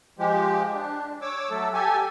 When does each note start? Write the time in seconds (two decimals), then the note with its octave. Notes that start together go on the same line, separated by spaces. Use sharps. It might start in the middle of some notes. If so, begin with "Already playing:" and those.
0.19 F3 G#3 G4
0.74 D4
1.21 C#5 D6 E6
1.50 F#3 A3 A4
1.74 G4 A4 G#5